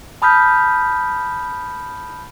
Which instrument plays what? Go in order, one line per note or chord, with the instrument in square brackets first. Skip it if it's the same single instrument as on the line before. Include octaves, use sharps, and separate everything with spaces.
[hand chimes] A5 B5 D#6 F6 G6 B6